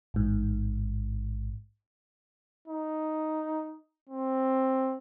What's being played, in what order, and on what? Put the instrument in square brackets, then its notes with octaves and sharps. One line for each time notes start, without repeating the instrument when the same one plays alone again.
[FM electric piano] A1 G#2
[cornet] D#4
C4